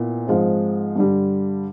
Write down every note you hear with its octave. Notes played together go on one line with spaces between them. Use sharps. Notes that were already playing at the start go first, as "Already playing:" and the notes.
Already playing: A#2 B3 E4
G#2 F3 G#3 C4
G2 D3 G3